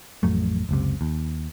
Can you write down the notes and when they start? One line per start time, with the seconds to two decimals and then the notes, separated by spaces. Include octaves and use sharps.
0.23 A1 F2 F#3 A3
0.69 F#1 C#2 C3
1.01 D#2